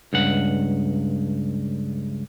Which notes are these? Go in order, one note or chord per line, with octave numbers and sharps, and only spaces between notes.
C#2 G2 F#5